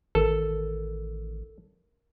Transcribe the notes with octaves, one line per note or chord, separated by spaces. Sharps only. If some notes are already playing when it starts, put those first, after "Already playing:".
A1 D#3 A4 A#4